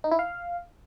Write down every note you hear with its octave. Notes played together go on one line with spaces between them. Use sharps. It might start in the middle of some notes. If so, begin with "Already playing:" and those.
D#4
E4
F5